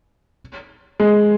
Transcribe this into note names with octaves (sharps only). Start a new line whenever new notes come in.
G#3